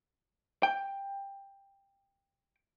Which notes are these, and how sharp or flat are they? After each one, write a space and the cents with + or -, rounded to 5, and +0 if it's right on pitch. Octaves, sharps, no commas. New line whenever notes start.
G5 +15